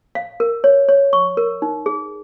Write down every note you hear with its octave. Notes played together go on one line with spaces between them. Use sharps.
F5
A#4
C#5
C#5
C#6
A#4
D#4
G#4